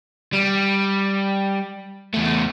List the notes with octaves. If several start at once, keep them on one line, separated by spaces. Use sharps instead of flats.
G3
E2 A3